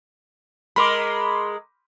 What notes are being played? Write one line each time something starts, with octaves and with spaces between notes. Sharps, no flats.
G#3 A#4 B5 C6 D6